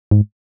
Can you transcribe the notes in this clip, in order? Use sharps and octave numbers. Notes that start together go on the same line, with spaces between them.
G#2